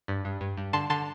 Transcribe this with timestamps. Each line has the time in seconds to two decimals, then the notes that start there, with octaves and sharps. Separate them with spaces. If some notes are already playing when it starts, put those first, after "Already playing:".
0.08 G2
0.25 G2
0.41 G2
0.57 G2
0.73 D3 A5 C6
0.90 D3 A5 C6